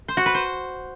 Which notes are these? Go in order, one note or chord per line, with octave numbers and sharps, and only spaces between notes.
C5
F#4
B4
C5